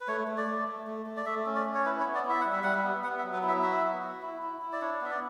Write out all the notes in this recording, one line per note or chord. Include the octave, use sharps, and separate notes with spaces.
B4
A3 C#5
A3
D5
A3
A3
A3
A3
D5
A3 E5
C#4
D5
C#4
C#5
E4 B4
C#5
B3
D5
E4
E5
G3 F#5
E5
G3 F#5
E5
B3
B3 F#5
E5
F#3
B4
E4
E5
F#4 E5
B3
F#4
E4
E4
E4
D5
D4 C#5
B3 E5
D5